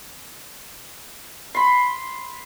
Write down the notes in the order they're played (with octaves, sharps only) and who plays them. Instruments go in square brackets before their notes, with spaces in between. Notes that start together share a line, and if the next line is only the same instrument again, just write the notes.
[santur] B5 C6